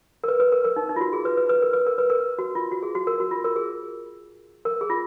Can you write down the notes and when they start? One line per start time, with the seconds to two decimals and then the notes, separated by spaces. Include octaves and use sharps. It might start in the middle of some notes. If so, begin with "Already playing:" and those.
0.24 A#4
0.28 B4
0.40 B4
0.52 A#4
0.64 A#4
0.76 D#4
0.89 D#4
0.96 F4
1.01 F#4
1.13 G#4
1.25 B4
1.37 B4
1.49 B4
1.62 A#4
1.73 B4
1.87 A#4
1.98 B4
2.10 A#4
2.39 F#4
2.55 F4
2.72 F#4
2.83 G#4
2.95 F#4
3.07 A#4
3.20 F#4
3.31 F4
3.44 A#4
3.56 G#4
4.65 A#4
4.81 G#4
4.90 F4